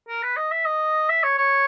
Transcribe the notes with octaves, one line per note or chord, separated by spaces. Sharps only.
A#4
B4
D#5
E5
D#5
E5
C#5
C#5